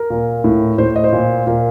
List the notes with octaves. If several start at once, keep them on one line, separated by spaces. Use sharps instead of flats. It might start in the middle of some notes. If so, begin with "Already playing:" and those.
Already playing: A#4
A#2
A2
A2 C5
D#5
C5
A#2
A#2 A#4